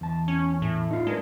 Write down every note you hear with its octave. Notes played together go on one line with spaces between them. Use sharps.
E2 A5
C#4
A2
D#4 F4
G#3 D4 A#4 B4